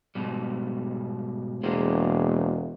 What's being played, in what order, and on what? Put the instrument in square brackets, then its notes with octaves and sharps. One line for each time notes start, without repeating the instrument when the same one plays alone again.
[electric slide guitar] G#2 B2 G3
[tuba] E1 [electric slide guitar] A#3 G#4 C5